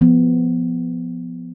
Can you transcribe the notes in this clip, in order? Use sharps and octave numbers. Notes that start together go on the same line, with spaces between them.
F3 B3